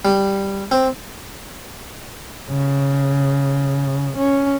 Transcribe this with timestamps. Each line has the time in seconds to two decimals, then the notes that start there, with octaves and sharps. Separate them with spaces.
0.05 G3
0.71 C4
2.50 C#3
4.17 C#4